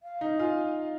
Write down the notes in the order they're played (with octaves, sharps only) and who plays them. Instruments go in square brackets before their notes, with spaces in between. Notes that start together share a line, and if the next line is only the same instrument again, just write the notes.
[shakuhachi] F5
[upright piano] D#4
[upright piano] F4 [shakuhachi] G#5
[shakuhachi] F5